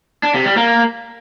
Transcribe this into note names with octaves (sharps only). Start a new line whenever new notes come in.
D4
C3
G3
A#3